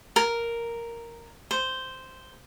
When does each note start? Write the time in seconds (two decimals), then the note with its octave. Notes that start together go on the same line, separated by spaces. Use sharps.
0.16 A#4
1.51 C5